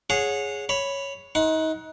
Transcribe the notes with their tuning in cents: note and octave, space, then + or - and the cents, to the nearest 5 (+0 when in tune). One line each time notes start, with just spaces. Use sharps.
G#4 +0 C#5 +0 F#5 -25
C#5 +0 B5 +0
D#4 +30 F#5 +0 C6 +20